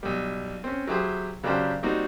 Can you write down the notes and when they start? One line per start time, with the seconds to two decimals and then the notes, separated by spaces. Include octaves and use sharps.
0.03 B1 G3
0.64 C4 C#4
0.87 F#3 E4 G4 G#4 C5
1.43 C#3 F#3 D4 G4 A#4 C5
1.83 G3 A#3 C4 D#4 F#4